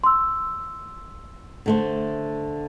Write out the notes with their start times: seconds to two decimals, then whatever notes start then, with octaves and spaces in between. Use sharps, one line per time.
0.04 C6 E6
1.66 D3 A3 C5